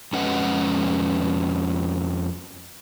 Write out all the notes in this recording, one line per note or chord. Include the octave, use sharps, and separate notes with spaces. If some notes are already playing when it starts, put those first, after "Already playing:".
F2 G#3 C#4 B4 D#5 F#5